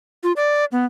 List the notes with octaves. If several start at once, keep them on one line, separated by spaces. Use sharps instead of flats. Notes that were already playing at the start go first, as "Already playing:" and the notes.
F4
D5
B3